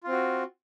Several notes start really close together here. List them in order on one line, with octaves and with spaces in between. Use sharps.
F4 C4 F#4